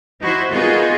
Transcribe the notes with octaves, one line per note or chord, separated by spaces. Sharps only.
D#4 E4 F#4 C5
B3 D#4 F4 F#4 G#4 A#4